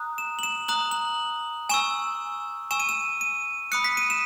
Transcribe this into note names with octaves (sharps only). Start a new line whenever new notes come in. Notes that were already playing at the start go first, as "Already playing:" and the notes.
Already playing: A#5 D#6 F#6
E7
F#7
E7
A#5 D#6 F#6 F#7
F#7
G#5 C#6 E6 E7
G#5 C#6 E6 E7
D#7
E7
D#7
B5 D#6 F#6 C#7
B6
D#7
E7